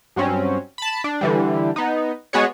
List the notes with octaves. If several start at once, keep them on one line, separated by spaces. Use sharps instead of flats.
G2 F#3 C4 C#4
A5 B5
D4
D3 E3 G3
B3 D#4
G#3 B3 F#4 G#4 C#5